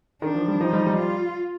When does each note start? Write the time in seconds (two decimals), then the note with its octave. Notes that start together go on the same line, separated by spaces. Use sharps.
0.22 D#3 D4
0.35 F3
0.48 G3
0.61 F3 D#4
0.73 G3
0.86 G3
0.98 F4